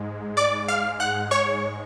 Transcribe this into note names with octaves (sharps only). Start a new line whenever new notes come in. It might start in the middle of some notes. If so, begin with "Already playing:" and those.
Already playing: G#2 G#3
D5 D6
F5 F6
F#5 F#6
C#5 C#6